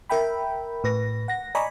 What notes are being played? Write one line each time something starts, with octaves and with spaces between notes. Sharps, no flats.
A#4 E5 G5 B5
A2 B4 A#6
F#5 A#6
D5 D#5 G#5 A#5 B5 C#6